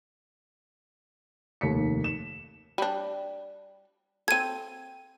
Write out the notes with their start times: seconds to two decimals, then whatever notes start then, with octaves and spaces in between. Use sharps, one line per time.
1.61 F1 D#2 B6 C#7
2.04 E7
2.78 G3 D4
4.28 C4 A4 G#6 D#7